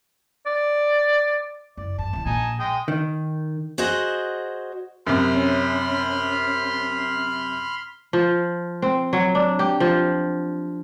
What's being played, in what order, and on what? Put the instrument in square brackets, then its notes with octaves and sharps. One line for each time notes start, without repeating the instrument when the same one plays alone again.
[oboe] D5
[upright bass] F#1 [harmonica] D5
[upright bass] G2 [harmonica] A5
[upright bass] C2 D#3
[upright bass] A#1 A#2 [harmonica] D#4 G#5 A5
[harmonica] G#3 G5 D#6
[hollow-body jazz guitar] D#3
[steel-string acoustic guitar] F#4 G#4 C5 D#5 F#5
[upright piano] F#2 C3 [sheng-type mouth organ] B5 C6 F6
[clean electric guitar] C#4
[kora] F3
C4
F#3
D4
G4
F3